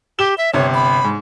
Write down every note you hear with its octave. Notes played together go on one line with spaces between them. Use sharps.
G4 E7 G7
E5
G1 C3 C#5
B5
G#2